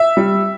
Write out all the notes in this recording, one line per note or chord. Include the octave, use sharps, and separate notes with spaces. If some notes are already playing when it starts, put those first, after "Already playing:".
Already playing: E5
G3